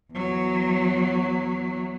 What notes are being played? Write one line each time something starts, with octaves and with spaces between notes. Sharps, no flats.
E2 F#3